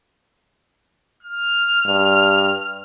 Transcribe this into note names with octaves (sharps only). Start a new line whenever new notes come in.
F6
G2